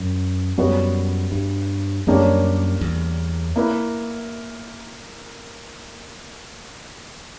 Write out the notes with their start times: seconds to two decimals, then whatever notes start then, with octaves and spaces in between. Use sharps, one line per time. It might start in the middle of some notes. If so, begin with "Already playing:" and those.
Already playing: F#2
0.58 F#2 G3 B3 F#4 C#5
1.32 G2
2.07 F#2 G3 A#3 D4 G4 C#5
2.81 E2
3.56 A#3 E4 B4